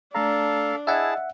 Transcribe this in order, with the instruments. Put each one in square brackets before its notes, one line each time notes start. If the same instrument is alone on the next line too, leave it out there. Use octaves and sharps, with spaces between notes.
[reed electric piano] A3 A#5 [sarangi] D4 [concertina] A4 F5
[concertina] E4 G#4 A5 [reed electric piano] D#5 E6 [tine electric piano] E5 F#5